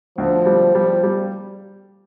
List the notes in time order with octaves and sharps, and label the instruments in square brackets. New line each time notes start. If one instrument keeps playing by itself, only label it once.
[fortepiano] D2 [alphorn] F3
[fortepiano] G3
[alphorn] F3 [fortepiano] G3
[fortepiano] G3